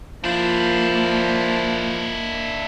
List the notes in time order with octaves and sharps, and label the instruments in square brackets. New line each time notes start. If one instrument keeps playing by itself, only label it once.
[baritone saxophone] F3 [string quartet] A#3 [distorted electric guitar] D4 E4